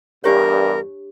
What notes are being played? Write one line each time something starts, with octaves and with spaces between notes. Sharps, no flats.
E2 G2 D4 G4 A#4 C#5